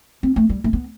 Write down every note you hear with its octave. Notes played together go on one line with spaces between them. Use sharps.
C4
A3
G3
A3
B3